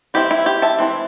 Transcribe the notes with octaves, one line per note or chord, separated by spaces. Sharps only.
E3 C4 E4 G4
E4
G4
E5 A5
E3 C4 E4